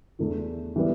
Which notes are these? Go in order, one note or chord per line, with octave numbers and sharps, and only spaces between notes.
E2 D3 A3 E4
E3 G3 B3 E4